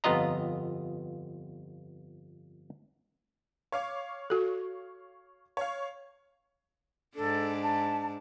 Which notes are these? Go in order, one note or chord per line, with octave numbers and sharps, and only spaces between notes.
G1 F2 B3 F4 D#5 A#5
C#5 F5 D6
F#4 A4
C#5 F5
G#2 D4 A4
A5